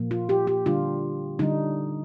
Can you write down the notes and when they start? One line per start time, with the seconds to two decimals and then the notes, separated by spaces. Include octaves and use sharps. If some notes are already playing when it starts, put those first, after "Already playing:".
Already playing: A#2 F3 A#3
0.11 F4
0.29 G4
0.47 G4
0.66 D3 G3 D4 F4
1.39 D3 G3 D4 D#4